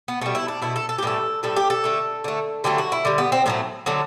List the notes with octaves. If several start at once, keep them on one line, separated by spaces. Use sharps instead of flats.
B3
B2 G3 A3
E4
D4
B2 A3 E4
A4
A4
G4
A2 E3 G3 A4
A2 G3 A4
G4
A4
D3 A3
D3 A3
D3 F#3 A3 G4
F#4
E4
D3 G3
B3
C4
A2 F#3 A3 C4
D3 F#3 A3